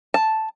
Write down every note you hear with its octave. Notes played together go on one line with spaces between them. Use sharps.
A5